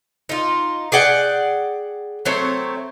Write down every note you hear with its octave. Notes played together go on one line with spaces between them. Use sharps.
D#4 F4
G#4 D5 F#5 G5
F#3 A3 C4 C#5